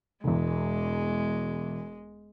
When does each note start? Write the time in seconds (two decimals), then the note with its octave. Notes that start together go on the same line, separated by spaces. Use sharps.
0.24 E1 E2 G#3